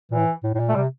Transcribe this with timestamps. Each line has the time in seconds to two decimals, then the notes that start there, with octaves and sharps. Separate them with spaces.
0.11 A#2 E3
0.19 A2
0.43 A2
0.55 A2
0.60 A#2
0.69 A3
0.75 C3 G3